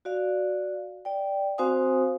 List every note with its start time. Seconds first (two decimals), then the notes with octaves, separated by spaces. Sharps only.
0.05 F#4 D5 F5
1.05 D5 G5
1.58 C4 F#4 C5 F5 G#5 D#6